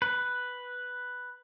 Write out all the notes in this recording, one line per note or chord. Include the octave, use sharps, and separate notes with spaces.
B4